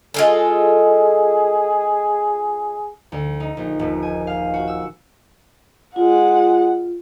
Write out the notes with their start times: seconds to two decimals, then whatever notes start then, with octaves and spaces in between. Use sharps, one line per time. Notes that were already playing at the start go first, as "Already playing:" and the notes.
0.14 G#3 F4 G#4 A4
3.12 D2
3.40 D#4
3.57 A#1
3.79 D#1
4.02 G#5
4.27 F5
4.54 F#4
4.67 E6
5.96 G#3 F4 F#5